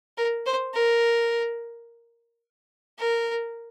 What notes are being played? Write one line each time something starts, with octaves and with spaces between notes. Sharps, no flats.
A#4
C5
A#4
A#4